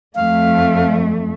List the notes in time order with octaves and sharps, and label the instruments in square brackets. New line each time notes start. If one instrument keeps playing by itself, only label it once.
[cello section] F2 A3 [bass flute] F5